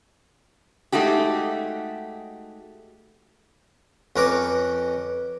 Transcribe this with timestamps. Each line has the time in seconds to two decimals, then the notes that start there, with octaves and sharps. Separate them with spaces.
0.92 G#3 A3 D#4 F#4 G4
4.16 F2 C#4 A#4 B4 A#5 D6